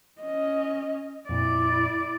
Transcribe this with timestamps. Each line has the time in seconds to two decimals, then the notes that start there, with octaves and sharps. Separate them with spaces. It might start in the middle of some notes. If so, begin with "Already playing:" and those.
0.21 C#4 D#5
1.29 F2 A#2 E4 D5